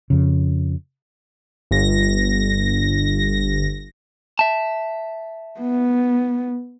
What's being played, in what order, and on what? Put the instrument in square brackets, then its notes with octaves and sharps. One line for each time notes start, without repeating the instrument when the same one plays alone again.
[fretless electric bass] F2 C#3
[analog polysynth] G1 A#6
[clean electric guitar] E5 A5
[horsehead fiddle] B3